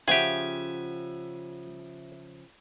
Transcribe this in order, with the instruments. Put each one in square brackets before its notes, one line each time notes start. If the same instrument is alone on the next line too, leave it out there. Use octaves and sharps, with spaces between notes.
[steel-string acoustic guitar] C#3 F3 F#5 [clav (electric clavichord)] G4 G#4 [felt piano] E5 [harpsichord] G#5